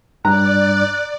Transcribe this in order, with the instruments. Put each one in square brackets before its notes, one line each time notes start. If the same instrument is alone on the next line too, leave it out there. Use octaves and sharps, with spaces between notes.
[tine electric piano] G2 [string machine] D5 [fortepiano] A#5 [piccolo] F#6